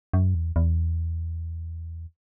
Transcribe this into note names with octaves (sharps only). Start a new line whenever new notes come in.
F#2
E2
E2